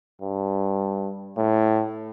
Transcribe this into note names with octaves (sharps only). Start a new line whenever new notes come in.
G2
A2